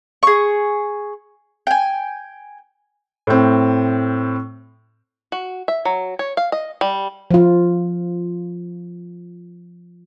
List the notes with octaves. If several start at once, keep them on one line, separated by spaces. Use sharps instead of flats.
G#4 C#6
G5 G#5
A2 C4
F#4
E5
F#3
C#5
F5
D#5
G3
F3 F4